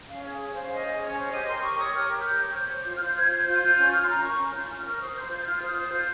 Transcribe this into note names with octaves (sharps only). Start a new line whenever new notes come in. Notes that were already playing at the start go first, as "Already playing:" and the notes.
C#4 F5
G#4 C#5
C#4 C#5
C5 F5
C#5
C#4 D#5
G#4
C#4 C#5
C5
G4 D#5
A#4 C6
G4 C#6
C#5 D#6
G4 F6
A#4
G4 G6
C#5
C5 G6
C5
F4 G6
F6
F4 G6
C5 G#6
C5 G6
F4 G6
F4 G6
C#4 G6
F4 F6
C6
C#4 A#5
A#4 C#6
C#4
F4 G6
C#4 F6
A#4 C#6
C5 D#6
C5 G6
F4 G6
F4 F6
C5 D#6
C5
F4 G6